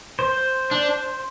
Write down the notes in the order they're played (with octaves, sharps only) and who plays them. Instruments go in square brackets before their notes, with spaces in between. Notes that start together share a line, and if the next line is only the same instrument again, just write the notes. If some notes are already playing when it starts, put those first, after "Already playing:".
[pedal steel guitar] C5
[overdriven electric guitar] D4